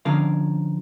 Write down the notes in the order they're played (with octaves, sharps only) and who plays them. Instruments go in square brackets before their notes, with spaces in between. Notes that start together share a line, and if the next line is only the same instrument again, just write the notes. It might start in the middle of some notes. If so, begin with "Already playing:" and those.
[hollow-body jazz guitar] D3 F3 C#4 A#4 F5